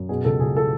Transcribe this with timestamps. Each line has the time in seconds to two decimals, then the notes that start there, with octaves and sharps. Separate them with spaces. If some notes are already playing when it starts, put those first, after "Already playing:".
Already playing: F#2
0.09 B2 G#4
0.25 C#2 A4
0.40 C#2 G#4
0.57 A4